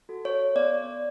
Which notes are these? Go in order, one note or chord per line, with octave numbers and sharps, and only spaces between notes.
F#4 A4
C#5
B3 D5